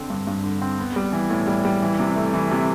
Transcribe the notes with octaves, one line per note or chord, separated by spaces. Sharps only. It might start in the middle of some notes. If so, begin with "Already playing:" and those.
Already playing: D3 C4
G2
G2
D3
C4
B3
G3
E3
A2
G3
G3
E3
C3
A3
E3
C3